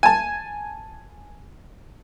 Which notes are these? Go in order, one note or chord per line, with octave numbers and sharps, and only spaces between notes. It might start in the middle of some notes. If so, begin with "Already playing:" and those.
G#5 A5